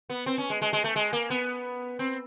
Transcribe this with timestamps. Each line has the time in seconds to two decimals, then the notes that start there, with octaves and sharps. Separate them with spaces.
0.10 B3
0.26 C4
0.38 C#4
0.50 G#3
0.62 G#3
0.73 G#3
0.84 A3
0.96 G#3
1.13 A#3
1.30 B3
1.99 C4